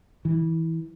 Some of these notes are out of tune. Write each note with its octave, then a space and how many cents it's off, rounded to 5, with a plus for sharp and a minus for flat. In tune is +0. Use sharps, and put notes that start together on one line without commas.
E3 -20